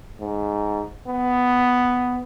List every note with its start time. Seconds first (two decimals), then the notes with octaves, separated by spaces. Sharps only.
0.20 G#2
1.07 B3